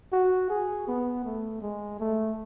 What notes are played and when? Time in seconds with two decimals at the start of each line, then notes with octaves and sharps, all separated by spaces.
0.12 F#4
0.50 G#4
0.87 B3
1.25 A3
1.62 G#3
2.00 A3